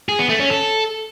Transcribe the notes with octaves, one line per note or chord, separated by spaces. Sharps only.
G#4
B3
A3
C#4
A4